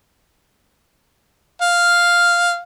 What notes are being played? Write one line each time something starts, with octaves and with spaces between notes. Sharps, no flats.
F5